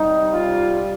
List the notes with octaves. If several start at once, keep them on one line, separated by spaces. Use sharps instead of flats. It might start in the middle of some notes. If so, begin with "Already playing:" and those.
Already playing: C3 G3 D#4
F4